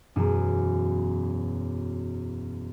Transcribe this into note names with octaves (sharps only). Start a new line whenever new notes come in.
E1 F#2 B3 C#4 E7